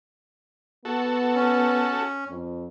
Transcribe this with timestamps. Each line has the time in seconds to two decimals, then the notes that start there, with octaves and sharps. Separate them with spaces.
0.85 B3 F#4 A4
1.35 C#4
2.28 F2